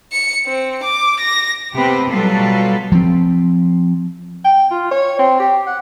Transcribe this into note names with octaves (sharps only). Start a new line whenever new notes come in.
C#7
C4
D6
A#6
C3 B3 C4 G4 B4
B2 F#3 G3 F4 A4 B4
F3 C4
G5
F4
C#5
C4
G4
F#5